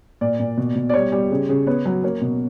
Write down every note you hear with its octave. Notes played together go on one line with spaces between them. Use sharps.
A#2 D5
A#2
B2
B2
D5
G3 C#5
G3
C#3
C#3
B3 C#5
F#3
A#3 C#5
B2